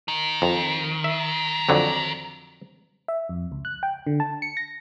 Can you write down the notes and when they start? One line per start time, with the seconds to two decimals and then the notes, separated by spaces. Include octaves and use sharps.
0.08 D#3
0.42 F2
1.04 E5
1.69 F2 D3 F#3
3.08 E5
3.29 F2
3.52 C#2
3.65 F#6
3.83 G5
4.07 D3
4.20 A5
4.42 C#7
4.57 A#6